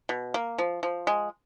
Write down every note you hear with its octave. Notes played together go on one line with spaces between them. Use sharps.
B2
A#3
F3
F3
G#3